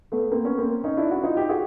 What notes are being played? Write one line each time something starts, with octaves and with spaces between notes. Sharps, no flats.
A3 B3
A#3 C4
B3 C#4
A#3 C4
C#4 D#4
D4 E4
E4 F#4
D#4 F4
F4 G4
F#4 G#4